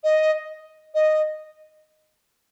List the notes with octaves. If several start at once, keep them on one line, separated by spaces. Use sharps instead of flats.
D#5
D#5